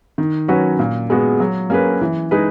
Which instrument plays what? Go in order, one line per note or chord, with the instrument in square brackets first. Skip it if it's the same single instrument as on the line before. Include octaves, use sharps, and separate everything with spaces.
[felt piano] D#3
F#3 C#4 F#4 B4
A#2
G#3 B3 F#4
F#3
A#3 C#4 G#4 B4
E3
G#3 D#4 G#4 B4